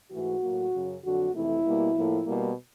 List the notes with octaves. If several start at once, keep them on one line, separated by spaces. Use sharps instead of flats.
G#2 E3 A3 F#4
A2 F#3 A#3
F#2 C#3 F#3
F2 D3 F#3 F#4
F2 C3 E3 A3 E4
B2 G3 A#3
A2 F3 A#3
B2 G3 A#3